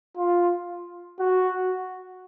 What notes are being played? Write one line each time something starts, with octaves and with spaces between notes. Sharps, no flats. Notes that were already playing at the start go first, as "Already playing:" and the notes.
F4
F#4